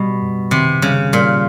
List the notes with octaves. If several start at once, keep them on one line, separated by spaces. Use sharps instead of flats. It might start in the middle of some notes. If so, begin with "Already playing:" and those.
Already playing: B2 G3 B3
F#2
C3 D#3
C#3 G3
A#2 G3